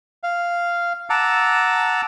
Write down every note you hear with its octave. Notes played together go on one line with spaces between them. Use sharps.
F5
F#5 A5 A#5 D6 E6